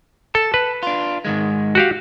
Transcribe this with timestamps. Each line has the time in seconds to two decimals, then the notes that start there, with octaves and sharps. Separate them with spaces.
0.35 A4 A5
0.54 B4
0.83 D4 F4
1.25 G#2 D#3 G#3
1.75 F#4 G4 F5